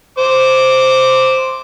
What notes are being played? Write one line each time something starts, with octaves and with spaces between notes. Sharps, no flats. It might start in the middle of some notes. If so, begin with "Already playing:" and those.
C5 D6